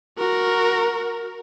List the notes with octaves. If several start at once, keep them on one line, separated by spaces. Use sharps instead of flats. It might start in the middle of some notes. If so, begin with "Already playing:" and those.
F#4 A#4